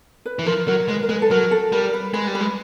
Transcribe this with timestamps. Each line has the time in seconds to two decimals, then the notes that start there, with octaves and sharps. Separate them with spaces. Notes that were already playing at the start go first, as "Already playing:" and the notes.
0.26 B4
0.39 E3
0.46 F3 A#4
0.67 F#3 A#4
0.88 G#3 B4
1.03 A#4
1.09 G#3 B4
1.22 A4
1.30 F#3 A#4
1.51 A4
1.72 G3 A#4
1.94 B4
2.14 G#3 B4
2.27 G3
2.35 B4
2.41 G#3